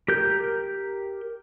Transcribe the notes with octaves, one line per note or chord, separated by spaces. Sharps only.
G4 A#4 G6